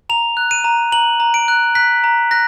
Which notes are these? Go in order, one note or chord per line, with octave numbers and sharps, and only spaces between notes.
A#5 F7
F#6
D#7
A#5
A#5 F#7
A#5
D7
F#6
F#6 B6
A#5
F#6 A#6